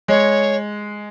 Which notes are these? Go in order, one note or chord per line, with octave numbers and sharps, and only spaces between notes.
G#3 C#5